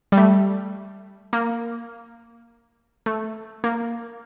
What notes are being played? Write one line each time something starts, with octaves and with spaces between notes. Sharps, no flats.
G3
A3
A#3
A3
A#3